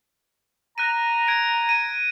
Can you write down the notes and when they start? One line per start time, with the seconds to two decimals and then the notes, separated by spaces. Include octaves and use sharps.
0.78 A#5 F#6 A#6 D#7
1.28 G#6 D7
1.69 D#7